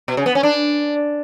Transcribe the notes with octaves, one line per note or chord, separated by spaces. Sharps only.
B2
C#3
B3
C#4
D4